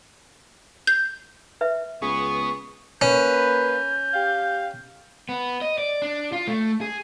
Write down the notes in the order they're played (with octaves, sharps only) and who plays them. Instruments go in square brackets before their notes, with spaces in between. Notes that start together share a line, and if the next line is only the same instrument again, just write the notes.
[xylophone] G6
[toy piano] B4 E5
[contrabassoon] C#2 [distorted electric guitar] B3 [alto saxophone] G#4 [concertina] C#6
[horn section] A#3 B4 [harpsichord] C#4 [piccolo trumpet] G6
[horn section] G4 F5
[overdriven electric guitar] B3
D#5
D5
D4
F4
A3
G#4